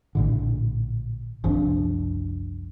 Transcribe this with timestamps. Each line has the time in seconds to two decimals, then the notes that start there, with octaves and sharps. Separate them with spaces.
0.15 A#1 A2 D3
1.44 F#1 C2 F3 D4